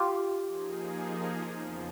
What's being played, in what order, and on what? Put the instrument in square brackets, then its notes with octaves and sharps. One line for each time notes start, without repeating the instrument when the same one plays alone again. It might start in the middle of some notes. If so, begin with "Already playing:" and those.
Already playing: [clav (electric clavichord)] F4 G4
[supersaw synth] F3 A#3 D#4 G#4
E2 C#3 F3